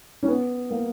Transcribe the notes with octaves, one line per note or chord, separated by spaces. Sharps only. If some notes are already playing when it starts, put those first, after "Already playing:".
C#4
B3
A#3